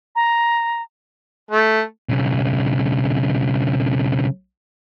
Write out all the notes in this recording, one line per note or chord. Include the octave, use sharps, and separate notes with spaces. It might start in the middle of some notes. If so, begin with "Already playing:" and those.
A#5
A3
B1 C#3